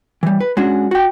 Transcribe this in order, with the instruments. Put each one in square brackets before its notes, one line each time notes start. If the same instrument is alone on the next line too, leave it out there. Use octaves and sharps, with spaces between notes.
[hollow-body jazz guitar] E3 G3
B4
G#3 C#4 D4 F#4
F#4 G5